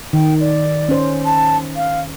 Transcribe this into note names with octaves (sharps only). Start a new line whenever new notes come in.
D#3 G5
D5
C#4 C5
A5
F5